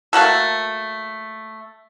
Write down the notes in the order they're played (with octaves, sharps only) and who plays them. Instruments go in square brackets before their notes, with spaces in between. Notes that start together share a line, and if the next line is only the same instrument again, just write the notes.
[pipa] A3 A#3 F#4 A4